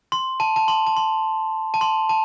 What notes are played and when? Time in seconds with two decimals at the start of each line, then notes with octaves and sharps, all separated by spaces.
0.12 C6
0.40 A5
0.56 A5
0.68 C6
0.87 A5
0.97 C6
1.74 A5
1.81 C6
2.09 A5